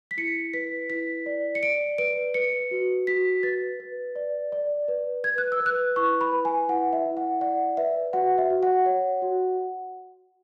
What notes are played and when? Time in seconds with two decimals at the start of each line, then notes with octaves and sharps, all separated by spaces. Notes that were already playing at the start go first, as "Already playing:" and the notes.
0.11 B6
0.17 E4 C#7
0.54 B4 B6
0.90 E4 B6
1.26 D5
1.55 C#7
1.63 D5 D7
1.98 B4 D7
2.34 B4 C#7
2.71 F#4
3.07 F#4 B6
3.43 B4 A6
3.80 B4
4.16 D5
4.52 D5
4.88 B4
5.24 B4 G#6
5.38 F#6
5.52 E6
5.60 B4
5.66 F#6
5.96 E4 C#6
6.21 B5
6.32 B4
6.45 G#5
6.69 E4 F#5
6.93 E5
7.06 E4
7.17 F#5
7.41 D5 F#5
7.77 B4 E5
8.13 F#4 F#5
8.38 E5
8.50 F#4
8.63 F#5
8.86 C#5
9.22 F#4